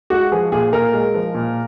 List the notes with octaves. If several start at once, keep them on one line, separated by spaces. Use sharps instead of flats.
G#3 F#4
F3 G#4
A#2 G#4
A#2 A#4
G#3
F3
A#2